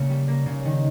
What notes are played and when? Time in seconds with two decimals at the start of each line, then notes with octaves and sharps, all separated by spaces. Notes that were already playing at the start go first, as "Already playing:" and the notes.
Already playing: C#3 A#3 C#4
0.10 G3
0.28 A#3
0.46 C#3
0.65 D#3